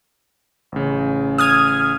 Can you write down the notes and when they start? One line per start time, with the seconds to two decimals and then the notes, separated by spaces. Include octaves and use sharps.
0.72 A1 C#3
1.38 D#6 F6 G#6